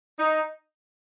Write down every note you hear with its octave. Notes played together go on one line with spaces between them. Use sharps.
D#4